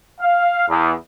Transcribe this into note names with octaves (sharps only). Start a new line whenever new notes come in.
F5
E2